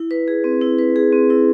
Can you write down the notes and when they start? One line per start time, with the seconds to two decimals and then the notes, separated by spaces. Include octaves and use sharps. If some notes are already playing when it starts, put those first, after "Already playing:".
Already playing: E4
0.11 B4
0.28 G#4
0.44 C4
0.61 E4
0.78 B4
0.96 G#4
1.13 C4
1.30 E4